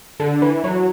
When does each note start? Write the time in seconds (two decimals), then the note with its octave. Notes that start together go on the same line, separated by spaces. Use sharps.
0.20 D3
0.42 E3
0.64 F#3